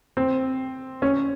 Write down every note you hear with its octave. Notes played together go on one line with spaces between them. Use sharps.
C4
C#4